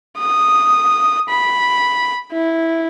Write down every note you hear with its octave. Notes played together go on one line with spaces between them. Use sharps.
D#6
B5
E4